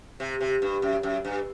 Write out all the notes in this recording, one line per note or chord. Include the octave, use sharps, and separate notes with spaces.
C3
C3
G2
F#2
F#2
G2